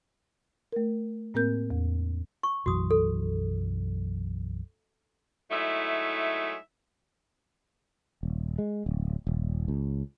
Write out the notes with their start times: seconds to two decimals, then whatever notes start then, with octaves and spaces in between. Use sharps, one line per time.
0.72 A3 A#4
1.34 A2 A#3 C4 A#4 G6
1.70 E2
2.43 C#6
2.66 B1 F#2 E3 F#4 D#6
2.91 A4
5.51 F#3 G#3 A3 D#4 E4 E5
8.23 D#1
8.58 G#3
8.86 D1
9.27 D#1
9.68 C#2